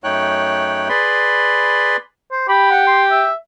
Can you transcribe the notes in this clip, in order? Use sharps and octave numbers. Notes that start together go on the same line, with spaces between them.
F#2 A3 D#4 C#5 G5 F#6
G#4 B4 D5 B5 C6
C5
G4 B5
F#5
C6
E5